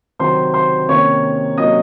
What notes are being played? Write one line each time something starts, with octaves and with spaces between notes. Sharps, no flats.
C3 D#3 F#3 C5 C6
C5 C6
C3 D#3 A#3 C#4 C#5 C#6
C3 F#3 A#3 C#4 D#5 D#6